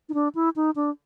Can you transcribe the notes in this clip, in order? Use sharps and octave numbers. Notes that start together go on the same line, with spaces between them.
D#4
D4
E4
D#4
D4